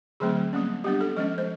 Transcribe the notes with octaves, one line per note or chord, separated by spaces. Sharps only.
D3 F#3 A3 C4 G#4
G3 A#3 C#4
G3 B3 D4 G4
A4
F3 G#3 C#4 D#5
C5